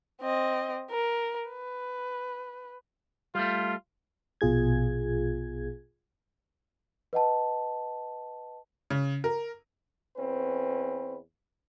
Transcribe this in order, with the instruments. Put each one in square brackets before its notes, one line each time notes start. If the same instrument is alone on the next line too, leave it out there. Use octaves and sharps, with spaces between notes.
[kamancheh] C4 D#5
A#4
B4
[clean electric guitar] G3 A3 [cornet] F4
[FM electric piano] A#1 B2 F4 G#4 G#6
[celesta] B4 D#5 F#5 A5
[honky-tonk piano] C#3
A#4
[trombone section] E2 C4 C#4 B4